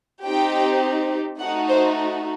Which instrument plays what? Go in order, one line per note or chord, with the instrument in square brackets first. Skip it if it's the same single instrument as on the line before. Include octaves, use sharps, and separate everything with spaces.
[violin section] C4 D#4 G4 G5
A3 D#4 F#4 F#5
C5